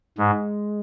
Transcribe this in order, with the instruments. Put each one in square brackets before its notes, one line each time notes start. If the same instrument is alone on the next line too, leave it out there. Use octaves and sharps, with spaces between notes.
[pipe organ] G#2 [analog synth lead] G#3